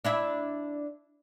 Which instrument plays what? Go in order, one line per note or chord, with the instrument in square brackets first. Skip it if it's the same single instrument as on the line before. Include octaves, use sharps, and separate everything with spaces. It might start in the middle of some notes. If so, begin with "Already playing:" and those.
[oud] D4 E4 E5